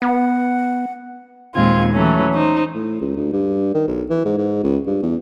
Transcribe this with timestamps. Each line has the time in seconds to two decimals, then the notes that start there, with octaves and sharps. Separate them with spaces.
0.02 B3 F#5
1.54 D#2 A#2 G#3 C4 F4 G#6
1.93 E3 F#3 A3 C#4
2.34 D#4 C5
2.75 A2
3.01 C#2
3.16 D2
3.33 G2
3.74 D#3
3.88 B1
4.10 E3
4.25 G#2
4.38 G#2
4.63 C#2
4.86 G2
5.02 E2